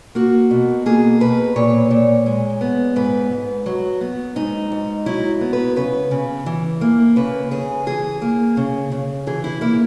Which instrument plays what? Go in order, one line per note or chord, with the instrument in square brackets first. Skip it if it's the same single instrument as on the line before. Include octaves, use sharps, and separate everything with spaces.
[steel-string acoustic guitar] A#3 F#4
B2
A#3 G#4
B2 B4
A#2 C#5
A#2
G#3
B3
G#2 B4
G#2
F#3
B3
G#2 D#4
G#2
F#3 E4
B3
B4
C#3 B4
C#3
E3
A#3
C#3 B4
C#3 G#4
E3 G#4
A#3
C#3
C#3
E3 G#4
E4
A#3 E4